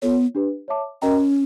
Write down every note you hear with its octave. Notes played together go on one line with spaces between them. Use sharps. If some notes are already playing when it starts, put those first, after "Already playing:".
B3 F4 A4 C#5
D4 G4 B4
C#5 E5 A5 D6
C#4 F#4 A#4 D#5 G5 A#5